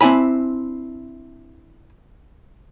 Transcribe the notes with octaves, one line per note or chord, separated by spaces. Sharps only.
C4 D4 E4 G#5 B5